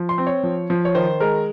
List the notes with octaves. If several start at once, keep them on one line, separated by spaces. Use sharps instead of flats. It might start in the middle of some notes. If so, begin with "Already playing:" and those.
Already playing: F3
C6
C4
C#5
F3
F3
C#5
D#3 C5
G#3 A#4